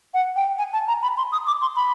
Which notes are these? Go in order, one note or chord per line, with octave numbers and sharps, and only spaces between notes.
F#5
G5
G#5
A5
A#5
B5
C6
D#6
D6
C6
B5